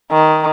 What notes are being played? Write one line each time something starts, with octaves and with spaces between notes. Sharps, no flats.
D#3